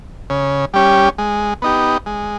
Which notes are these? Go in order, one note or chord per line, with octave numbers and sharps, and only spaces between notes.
C#3
G3 C#4 G4
G#3
B3 D#4 G4
G#3